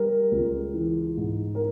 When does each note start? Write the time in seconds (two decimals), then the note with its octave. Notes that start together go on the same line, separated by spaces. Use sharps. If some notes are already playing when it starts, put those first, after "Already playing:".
Already playing: G3 A#4
0.31 C#2
0.74 E3
1.17 G#2
1.55 A#4